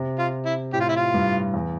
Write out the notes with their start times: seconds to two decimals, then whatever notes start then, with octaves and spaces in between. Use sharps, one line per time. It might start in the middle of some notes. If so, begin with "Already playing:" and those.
Already playing: C3
0.19 F4
0.46 E4
0.73 A2 G4
0.81 F4
0.89 E4
0.96 F4
1.14 G2
1.54 E2